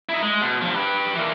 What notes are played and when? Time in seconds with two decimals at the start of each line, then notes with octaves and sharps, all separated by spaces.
0.09 D#4 E4
0.22 G#3
0.42 B2
0.62 G2 F3
0.75 G4 B4
1.15 E3 A#3